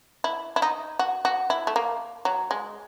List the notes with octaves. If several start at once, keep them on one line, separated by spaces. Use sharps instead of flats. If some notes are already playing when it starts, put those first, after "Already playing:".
E4
E4
D#4
F#4
F#4
E4
A3
A#3
F#3
G#3